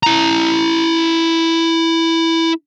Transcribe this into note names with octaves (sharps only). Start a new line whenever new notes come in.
E4 A#5